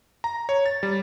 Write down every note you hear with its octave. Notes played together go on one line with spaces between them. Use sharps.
A#5
C#5
A6
G3